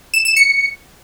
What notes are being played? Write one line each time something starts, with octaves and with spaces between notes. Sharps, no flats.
E7
E7
C#7